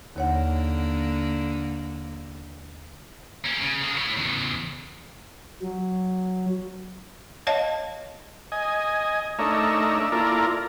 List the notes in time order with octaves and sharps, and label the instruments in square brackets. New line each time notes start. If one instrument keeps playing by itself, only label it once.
[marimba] D#2 C#5 F#5 [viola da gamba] D3 A#3
[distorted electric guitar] A#3 C#4
C#3
A#3 G#4
E4 C#5
E2 C#3
[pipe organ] F#3
[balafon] C#5 D#5 F5 A5
[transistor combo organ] D#5 G#5
A3 D4 D#4 A#4 C#5 E5
D5 E5
A#3 E4 F4 A4 A#4 D5